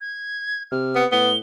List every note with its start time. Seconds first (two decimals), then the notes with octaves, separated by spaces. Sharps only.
0.01 G#6
0.72 C3 F6
0.95 B3
1.12 A2 B3 G7